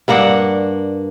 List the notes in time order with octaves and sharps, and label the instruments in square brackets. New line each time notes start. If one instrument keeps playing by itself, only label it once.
[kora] G2 A#3 D4 F#5